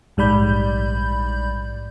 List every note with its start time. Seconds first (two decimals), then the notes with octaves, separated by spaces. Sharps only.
0.17 A#1 G#2 G3 D5 B5 G6